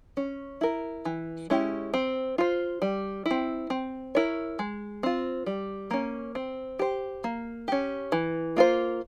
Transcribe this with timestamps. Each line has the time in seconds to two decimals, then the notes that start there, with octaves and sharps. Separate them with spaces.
0.17 C#4
0.61 E4 A#4
1.05 E3
1.50 G#3 C#4 E4 G4
1.94 C4
2.38 F4 C5
2.82 G3
3.26 E4
3.31 C4
3.70 C4
4.15 E4 A#4 C#5
4.59 G#3
5.03 C4 F4
5.46 G3
5.91 A#3 C#4
6.35 C4
6.79 G4 C5
7.24 A#3
7.68 C#4 G4
8.12 E3
8.57 A#3 F4 C5